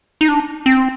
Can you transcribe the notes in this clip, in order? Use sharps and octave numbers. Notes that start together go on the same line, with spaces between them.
D#4
D4
C4